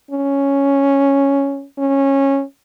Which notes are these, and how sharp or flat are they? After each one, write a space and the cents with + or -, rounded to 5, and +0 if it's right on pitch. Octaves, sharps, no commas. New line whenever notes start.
C#4 +0
C#4 -15